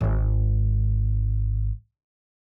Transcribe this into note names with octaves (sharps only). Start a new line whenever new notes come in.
G#1 G#2